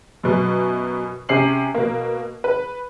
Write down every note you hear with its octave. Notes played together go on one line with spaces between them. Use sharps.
F#2 B2
C3 C#4 C7 F#7
B2 A#3
B4